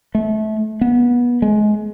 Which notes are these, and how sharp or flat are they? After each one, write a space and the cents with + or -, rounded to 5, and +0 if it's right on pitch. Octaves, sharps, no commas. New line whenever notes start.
A3 -30
B3 -25
G#3 +25